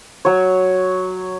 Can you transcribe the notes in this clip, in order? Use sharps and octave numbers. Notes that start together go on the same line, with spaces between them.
F#3 C#5